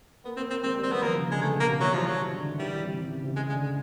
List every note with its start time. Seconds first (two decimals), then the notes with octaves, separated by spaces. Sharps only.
0.25 A#3 B3
0.37 A#3 C4
0.50 A#3 C4
0.63 G#3 C4
0.76 G3
0.83 C4
0.89 F#3 B3
1.02 F3 A#3
1.15 C#3
1.28 D3 G#3
1.42 C#3 A3
1.55 B2
1.60 A#3
1.67 C3
1.80 E3 F#3
1.87 G3
1.93 F3 G#3
2.06 F#3 G#3
2.19 G3
2.32 D3
2.45 D#3
2.58 E3 G3
2.72 E3
2.84 C3
2.97 C3
3.10 C#3
3.24 C3
3.36 C#3 G#3
3.49 D3 G#3
3.63 G#3